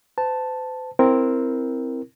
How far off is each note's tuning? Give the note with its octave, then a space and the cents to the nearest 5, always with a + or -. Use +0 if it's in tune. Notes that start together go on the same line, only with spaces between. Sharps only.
C5 -45 A5 +0
C4 +0 E4 +0 A#4 +0